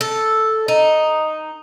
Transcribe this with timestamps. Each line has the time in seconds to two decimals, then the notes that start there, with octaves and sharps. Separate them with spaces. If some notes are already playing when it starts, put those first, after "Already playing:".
0.01 A4
0.68 D#4